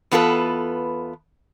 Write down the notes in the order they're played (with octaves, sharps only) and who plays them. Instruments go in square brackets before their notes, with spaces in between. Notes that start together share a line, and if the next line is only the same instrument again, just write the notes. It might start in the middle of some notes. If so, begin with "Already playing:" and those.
[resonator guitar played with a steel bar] E2 B3 F4 A4 B4